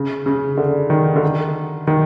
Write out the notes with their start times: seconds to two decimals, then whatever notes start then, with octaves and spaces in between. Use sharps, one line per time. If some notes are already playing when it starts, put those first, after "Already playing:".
Already playing: C#3
0.26 C#3
0.57 D3
0.90 D#3
1.16 D3
1.23 D#3
1.87 D#3